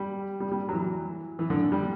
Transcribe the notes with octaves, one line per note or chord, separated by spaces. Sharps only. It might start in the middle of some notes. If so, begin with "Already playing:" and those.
Already playing: G3
G3
G3
F#3
E3
E3
D3
G3